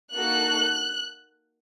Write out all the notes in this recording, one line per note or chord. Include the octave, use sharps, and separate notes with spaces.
A#3 D#4 F#4 A4 F#6